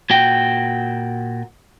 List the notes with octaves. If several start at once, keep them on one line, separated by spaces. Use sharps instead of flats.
A#2 F#4 G5